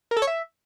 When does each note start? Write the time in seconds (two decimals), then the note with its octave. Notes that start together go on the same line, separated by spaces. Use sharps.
0.11 A#4
0.17 A4
0.22 C#5
0.27 E5